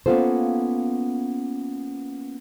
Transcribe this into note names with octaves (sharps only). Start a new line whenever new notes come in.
A#3 B3 C#4 F4 A4 C5